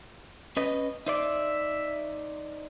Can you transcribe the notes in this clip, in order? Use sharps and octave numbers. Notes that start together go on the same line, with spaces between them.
C#4 B4 D#5
D#4 C5 D5 E5